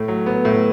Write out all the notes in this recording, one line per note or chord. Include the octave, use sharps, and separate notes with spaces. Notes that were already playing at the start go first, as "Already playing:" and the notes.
Already playing: A2 A3
F#3
B3
A2